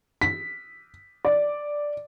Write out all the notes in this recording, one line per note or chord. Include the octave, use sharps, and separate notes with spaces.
B6
D5